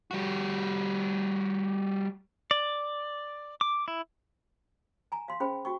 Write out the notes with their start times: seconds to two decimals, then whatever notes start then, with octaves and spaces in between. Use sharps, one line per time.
0.11 G3 F#4
2.51 D5
3.61 D6
3.88 E4
5.12 G#5 A#5
5.28 F5 C6
5.40 C#4 G#4 C5 G5 B5
5.65 F#4 G5 C#6